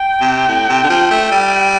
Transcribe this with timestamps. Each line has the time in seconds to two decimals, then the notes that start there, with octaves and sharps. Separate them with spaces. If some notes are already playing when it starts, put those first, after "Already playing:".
Already playing: G5
0.21 C3
0.48 A2
0.69 C3
0.83 D3
0.90 F3
1.11 A3
1.31 G3